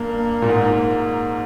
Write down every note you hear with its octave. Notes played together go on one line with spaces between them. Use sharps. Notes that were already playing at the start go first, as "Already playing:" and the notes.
Already playing: G2 A#3
A#2
G#2